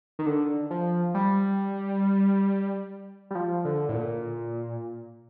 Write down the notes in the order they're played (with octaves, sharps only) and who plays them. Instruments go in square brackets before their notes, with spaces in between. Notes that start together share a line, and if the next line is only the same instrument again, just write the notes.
[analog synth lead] D#3
D3
F3
G3
G3
F3
D3
A2
A#2